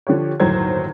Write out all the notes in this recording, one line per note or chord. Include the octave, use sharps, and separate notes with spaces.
D3 F3 G4 C#5
G1 D#2 A2 F#3 C5 G#6